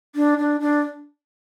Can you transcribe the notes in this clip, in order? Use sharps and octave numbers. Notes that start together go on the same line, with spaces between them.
D4
D4
D4